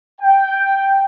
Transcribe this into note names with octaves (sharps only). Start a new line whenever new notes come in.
G5